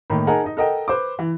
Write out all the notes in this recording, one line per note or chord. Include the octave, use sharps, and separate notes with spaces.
A2 D#3 A#3
D#4 G#4 A#4 F#5 G#5 A5
D#4 D#5
A4 A#4 D#5 F#5 G5
B4 C5 D6
E3